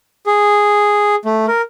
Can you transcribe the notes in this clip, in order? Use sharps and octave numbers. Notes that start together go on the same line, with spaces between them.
G#4
A3
A#4